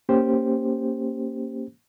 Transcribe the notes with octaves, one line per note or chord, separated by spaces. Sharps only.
A#3 C#4 G4 C5